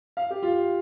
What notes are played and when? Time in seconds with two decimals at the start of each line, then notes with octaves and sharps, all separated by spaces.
0.17 F5
0.31 G4
0.43 F4